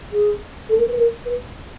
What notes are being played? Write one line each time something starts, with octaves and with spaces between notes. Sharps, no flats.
G#4
A4
A#4
B4
A#4
B4